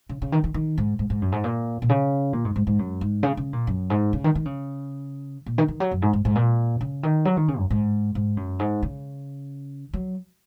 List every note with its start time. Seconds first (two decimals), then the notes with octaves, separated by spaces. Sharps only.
0.09 C#3
0.22 C#3
0.32 D#3
0.44 D#3
0.54 D#3
0.78 G#2
0.99 G#2
1.10 G#2
1.22 F#2
1.32 G#2
1.44 A#2
1.82 A#2
1.89 C#3
2.33 A#2
2.45 G#2
2.56 G#2
2.67 G#2
2.79 F#2
3.01 G#2
3.23 C#3
3.37 C#3
3.53 A#2
3.67 F#2
3.90 G#2
4.13 C#3
4.24 D#3
4.35 D#3
4.45 C#3
5.46 A#2
5.58 D#3
5.68 D#3
5.80 F#3
5.91 F#2
6.02 G#2
6.13 G#2
6.25 G#2
6.35 A#2
6.81 C#3
7.03 D#3
7.25 F#3
7.37 D#3
7.48 C#3
7.59 F#2
7.70 G#2
8.15 G#2
8.37 F#2
8.59 G#2
8.83 C#3
9.93 F#3